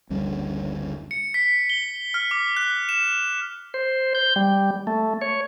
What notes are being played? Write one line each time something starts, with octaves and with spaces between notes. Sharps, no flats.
F#1 D2 G3 C#4
C#7
B6
G7
F6
D6
F#6
E7
C5
G6
G3
A3
C#5